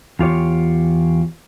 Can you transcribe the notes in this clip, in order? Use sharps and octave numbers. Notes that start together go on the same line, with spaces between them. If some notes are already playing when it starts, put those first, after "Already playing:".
E2 F4 G4 C#5